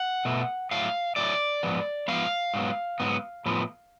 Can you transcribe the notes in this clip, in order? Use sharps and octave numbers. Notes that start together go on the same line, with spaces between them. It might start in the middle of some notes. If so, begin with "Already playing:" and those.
Already playing: F#5
B2 A3
A2 F#3 A3 F5
A2 F#3 A3 D5
G#2 F3 B3
G#2 F3 B3 F5
G#2 F#3 B3
G#2 F#3 B3
A2 F3 B3